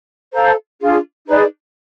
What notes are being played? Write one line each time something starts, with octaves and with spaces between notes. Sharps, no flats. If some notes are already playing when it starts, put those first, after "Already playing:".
A4 C5 F5 A#5
D4 F4 G#4
D#4 G#4 B4 D5